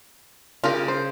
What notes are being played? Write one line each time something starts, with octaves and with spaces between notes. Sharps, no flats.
C#3 F4 G4 A#4
C5